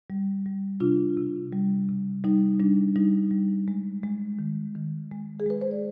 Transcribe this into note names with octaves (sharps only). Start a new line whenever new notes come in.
G3
G3
C3 D4 F4
C3
G3
C3
G3 D#4
G3 D4
G3 D#4
G3
G#3
G#3
D#3
D#3
G#3
G#4
G#3 B4
C5
D5